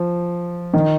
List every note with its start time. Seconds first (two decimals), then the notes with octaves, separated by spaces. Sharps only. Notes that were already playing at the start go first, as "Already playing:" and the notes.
Already playing: F3
0.74 D#3